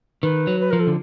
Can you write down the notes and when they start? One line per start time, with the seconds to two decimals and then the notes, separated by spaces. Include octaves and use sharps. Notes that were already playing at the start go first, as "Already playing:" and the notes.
0.23 D#3 B4
0.47 F#3
0.60 B4
0.70 F3 A#4
0.80 A4
0.87 D3